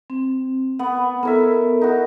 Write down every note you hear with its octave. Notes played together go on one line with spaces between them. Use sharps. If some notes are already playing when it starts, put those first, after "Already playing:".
C4
B3 F#5
B3 A4 A#4 C#5 E5
D#4 F#4